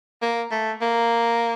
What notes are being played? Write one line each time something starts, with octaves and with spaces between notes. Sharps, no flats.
A#3
A3
A#3